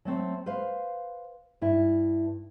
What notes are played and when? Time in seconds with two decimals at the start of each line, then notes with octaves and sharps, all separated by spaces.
0.05 F#3 A3 C4
0.46 B4 C5 F5
1.61 G2 E4